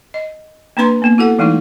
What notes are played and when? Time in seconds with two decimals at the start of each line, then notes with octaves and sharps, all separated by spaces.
0.14 D#5
0.77 A#3 C4 D4 B4 A#5 C6
1.02 A#3 B3
1.18 E4 F#4 A4 F#5
1.39 E3 G#3 A3 D#4 E4